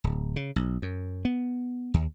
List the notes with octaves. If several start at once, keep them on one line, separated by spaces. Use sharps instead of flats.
D1
C#3
B1
F#2
B3
D#2